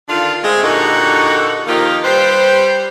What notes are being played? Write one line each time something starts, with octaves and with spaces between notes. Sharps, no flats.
D3 D#3 D4 F4
G#3 A3 C4
A#2 D3 D#4 F#4 G4 A4
D#3 F3 A#3 D#4 F4 G4
G3 G4 B4 C5